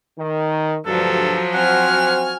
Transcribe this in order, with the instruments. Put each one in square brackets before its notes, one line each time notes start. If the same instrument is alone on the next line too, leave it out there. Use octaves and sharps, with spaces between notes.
[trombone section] D#3
[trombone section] D2 G2 [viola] F3 F#3 [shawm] A4
[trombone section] C4 F#4 C5 [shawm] F#5 [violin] G#5 F6